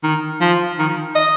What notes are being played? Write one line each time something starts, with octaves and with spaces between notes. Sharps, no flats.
D#3
F3
D#3
D#5